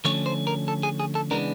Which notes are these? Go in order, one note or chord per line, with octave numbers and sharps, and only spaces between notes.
D3 F3 A3 C#4 C#5
C5
A#4
A4
G#4
G#4
A4
C#3 E3 G#3 B3 D4 A#4